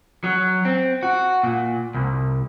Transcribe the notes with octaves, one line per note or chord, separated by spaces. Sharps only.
F#3
C4
F#4
A#2
C2